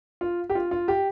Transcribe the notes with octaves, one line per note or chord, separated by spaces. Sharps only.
F4
G4
F4
F4
G4